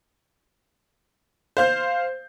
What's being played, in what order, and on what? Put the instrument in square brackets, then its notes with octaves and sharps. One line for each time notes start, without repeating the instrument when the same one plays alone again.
[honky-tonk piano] C5 F5 G6